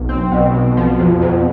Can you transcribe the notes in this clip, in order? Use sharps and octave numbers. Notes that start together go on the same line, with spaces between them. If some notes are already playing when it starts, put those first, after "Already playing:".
Already playing: B1
C4
B2
B2
F3
F2
F2